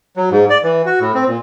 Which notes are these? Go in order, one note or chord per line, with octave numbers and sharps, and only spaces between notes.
F#3
G#2
D5
E3
F#4
A2
C4
A#2